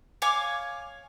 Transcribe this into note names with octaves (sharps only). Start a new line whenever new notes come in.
C#5 F5 G#5 D6